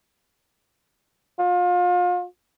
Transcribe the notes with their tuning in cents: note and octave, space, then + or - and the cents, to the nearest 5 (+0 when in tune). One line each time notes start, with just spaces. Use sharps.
F4 +35